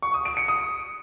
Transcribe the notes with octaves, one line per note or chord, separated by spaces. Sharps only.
C#6
D#6
D7
C#7
D#6